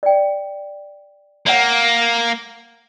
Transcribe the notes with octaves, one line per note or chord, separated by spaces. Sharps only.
D5 G5
A#3 C#5 F5 F#5